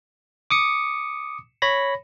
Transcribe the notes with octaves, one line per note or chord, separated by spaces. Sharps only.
D6 D#6 C#7
C#5 B5 A#6